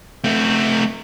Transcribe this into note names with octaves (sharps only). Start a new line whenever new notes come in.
A3 C4